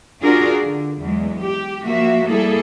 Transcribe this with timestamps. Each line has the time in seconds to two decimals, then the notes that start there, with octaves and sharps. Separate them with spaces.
0.23 D4 F4 F#4 G#4 A#4
0.61 D3
1.01 E2 F#3 G#3
1.41 G4
1.84 F3 A#3 F#4 E5
2.28 G3 A#3 E4 G#4 A4